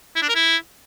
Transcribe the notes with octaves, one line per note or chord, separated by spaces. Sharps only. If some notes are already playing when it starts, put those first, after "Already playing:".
E4
D4
A#4
E4